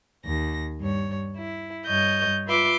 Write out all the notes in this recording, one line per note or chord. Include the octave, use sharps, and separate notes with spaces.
D#2 A#6
G2 C#5
E4
G2 C#5 D#5 G6
F4 B4 E5 C6 D6